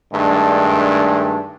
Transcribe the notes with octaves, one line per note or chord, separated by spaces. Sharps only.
G2 D#3 G#3 A3 D4